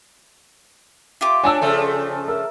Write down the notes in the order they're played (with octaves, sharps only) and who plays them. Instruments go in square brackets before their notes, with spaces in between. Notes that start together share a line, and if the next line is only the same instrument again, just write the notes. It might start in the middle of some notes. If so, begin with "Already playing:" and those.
[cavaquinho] F4 G4 D6 [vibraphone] E5 F5 C6
[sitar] D4 [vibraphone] C#5 [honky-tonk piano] G#5 A5 E6
[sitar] C#3 F3 A3 [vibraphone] A4
[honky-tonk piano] A#4 [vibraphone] E5 E6